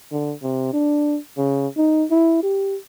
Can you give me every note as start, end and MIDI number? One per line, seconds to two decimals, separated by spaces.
0.12 0.32 50
0.43 0.68 48
0.73 1.18 62
1.38 1.67 49
1.77 2.05 63
2.11 2.40 64
2.43 2.77 67